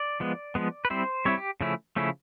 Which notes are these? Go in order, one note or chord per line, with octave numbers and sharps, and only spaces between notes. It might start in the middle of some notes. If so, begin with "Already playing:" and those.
Already playing: D5
F3 G#3 B3
F3 G#3 B3
B4
G3 C4 E4 C5
G3 C4 E4 C#5
G4
C#3 F3 A3 C#4 E4
C#3 F3 A3 C#4 E4